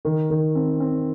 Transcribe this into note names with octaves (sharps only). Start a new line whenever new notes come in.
D#3
D#3
C4
C4